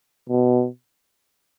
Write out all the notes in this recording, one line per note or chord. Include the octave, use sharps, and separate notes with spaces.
B2